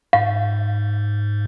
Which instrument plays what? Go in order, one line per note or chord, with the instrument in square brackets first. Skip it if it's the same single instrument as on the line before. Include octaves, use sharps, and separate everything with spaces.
[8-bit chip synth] G#2 [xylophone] F5